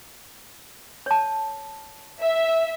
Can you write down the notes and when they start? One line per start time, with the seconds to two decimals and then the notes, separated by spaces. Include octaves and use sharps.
1.06 C#5 A5
2.22 E5